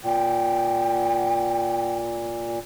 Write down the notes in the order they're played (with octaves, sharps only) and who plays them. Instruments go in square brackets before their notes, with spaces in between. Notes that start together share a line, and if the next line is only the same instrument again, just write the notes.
[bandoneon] A#2 [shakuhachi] G5